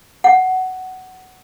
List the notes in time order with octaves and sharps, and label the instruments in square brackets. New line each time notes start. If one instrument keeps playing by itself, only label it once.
[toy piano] F#5